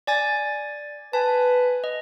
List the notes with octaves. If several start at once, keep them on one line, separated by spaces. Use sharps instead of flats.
D5 G#5 A6
B4 G#5 A5
D#5